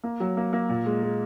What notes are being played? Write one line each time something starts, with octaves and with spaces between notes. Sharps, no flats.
A#3
F#3
A#3
A#3
A#2
G#3
G#3